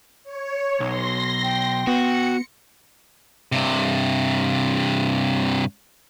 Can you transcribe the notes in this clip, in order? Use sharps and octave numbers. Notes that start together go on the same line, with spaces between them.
C#5
B1 C6 A#6
G5
B3 F#4 C#7
G2 C3